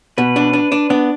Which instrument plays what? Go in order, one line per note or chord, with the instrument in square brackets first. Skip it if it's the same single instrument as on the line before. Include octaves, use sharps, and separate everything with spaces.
[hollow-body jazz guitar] B2 [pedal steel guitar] B4
[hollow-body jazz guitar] D4
D4
D4
[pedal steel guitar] B3 [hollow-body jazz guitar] D4